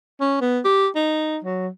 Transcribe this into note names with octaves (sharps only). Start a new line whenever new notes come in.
C#4
B3
G4
D#4
F#3